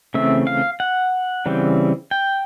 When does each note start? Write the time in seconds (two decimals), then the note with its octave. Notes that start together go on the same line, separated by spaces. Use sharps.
0.14 C#3 E3 A3 C4 E5
0.47 F5
0.80 F#5
1.46 C#3 E3 G3 C4
2.11 G5